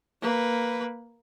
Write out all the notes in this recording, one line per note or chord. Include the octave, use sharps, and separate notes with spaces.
A#3 B4